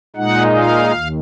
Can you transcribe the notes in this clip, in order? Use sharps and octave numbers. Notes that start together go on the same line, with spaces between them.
A#2 G#3 D#4 F#5
F5
D#2